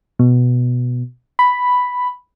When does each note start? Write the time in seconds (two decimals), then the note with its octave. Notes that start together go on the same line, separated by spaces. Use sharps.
0.19 B2
1.39 B5